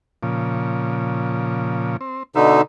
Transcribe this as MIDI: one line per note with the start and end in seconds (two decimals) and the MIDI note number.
0.23 1.97 46
0.23 1.97 49
0.23 1.97 53
2.01 2.23 60
2.35 2.61 47
2.35 2.61 50
2.35 2.61 63
2.35 2.62 71
2.35 2.62 76